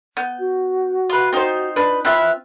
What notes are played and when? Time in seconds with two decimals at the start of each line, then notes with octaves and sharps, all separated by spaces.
0.17 B3 G6
0.39 F#4
1.10 F4 B4
1.33 C4 D#4 F4 C5
1.76 D4 B4
2.05 C4 F4 B4 E5 F5